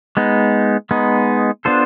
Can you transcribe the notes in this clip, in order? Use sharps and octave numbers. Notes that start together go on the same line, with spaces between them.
G#3 B3 D#4
G#3 B3 D#4
B3 D4 F4 A4 C5